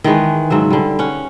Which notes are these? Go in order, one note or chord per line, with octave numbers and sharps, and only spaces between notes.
D#3 E3 G#3 B4
G#2 C#3 F#3 E5
D3 G3
C#4 F#5